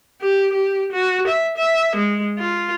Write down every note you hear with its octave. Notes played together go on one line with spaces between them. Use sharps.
G4
G4
F#4
E5
E5
G#3
F4